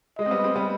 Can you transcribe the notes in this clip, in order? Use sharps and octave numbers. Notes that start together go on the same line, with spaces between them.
G#3 D#5
C4
G3 B3
G#3 C4
G3 B3